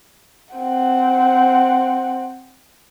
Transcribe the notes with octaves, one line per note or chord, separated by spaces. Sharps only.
C4 F#5